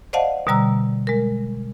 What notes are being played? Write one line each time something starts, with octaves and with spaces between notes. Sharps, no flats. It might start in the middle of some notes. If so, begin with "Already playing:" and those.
C5 D5 D#5 F5 F#5 A5
B2 D3 G3 A#5 E6
G#3 A#4